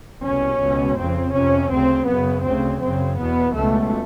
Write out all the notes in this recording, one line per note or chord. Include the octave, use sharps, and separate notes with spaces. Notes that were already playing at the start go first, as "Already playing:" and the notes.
C2 B2 C#4
C#2 B2
F2 C#3 C4
F2 C3 C#4
D2 C#3 C4
F#2 C#3 B3
D2 C#3 C4
F#2 C#3 C4
E2 B2 B3
C#2 B2 A3